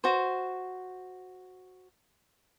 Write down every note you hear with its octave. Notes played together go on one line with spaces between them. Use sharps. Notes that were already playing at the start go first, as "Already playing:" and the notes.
F#4 C5